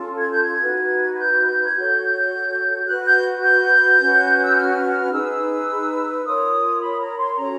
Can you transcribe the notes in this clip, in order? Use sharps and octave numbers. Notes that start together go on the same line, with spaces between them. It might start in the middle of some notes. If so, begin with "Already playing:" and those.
Already playing: C#4 F4 A4
G#6
G6
G#6
D#4 F#4 B4
G#6
G6
G#6
F#4 A4 C#5 G6
F#4 B4 F#6
G6
G6
C#4 F#4 B4
E6
F6
D#4 G#4 B4 E6
F4 A#4 C#5 D#6
B5
A#5
C6
C#4 F#4 A4 C#5 A#5